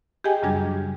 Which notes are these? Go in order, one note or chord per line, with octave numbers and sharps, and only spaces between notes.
G4 G#4 D#5 G5 G#5
F#2 C#3 F#3 G3 D4 G#6